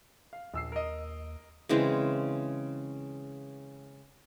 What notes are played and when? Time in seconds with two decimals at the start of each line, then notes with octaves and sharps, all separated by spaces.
0.33 F5
0.54 A#1 D#2 E6 C7
0.72 A#4 D#5
1.69 C#3 E3 G#3 C4